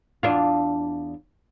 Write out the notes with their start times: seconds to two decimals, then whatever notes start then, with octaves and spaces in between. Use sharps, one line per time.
0.23 E2 D4 F4